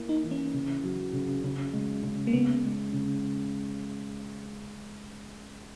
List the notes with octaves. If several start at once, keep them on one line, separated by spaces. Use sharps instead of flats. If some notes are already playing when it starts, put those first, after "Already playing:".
Already playing: A#3 E4
D#4
E3
C#4
C#3
F#3
C#3
C#3
G#3
C#3
A#3
C#3 B3
G#3
C#3